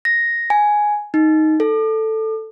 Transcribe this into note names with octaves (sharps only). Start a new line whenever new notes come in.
A#6
G#5
D#4
A4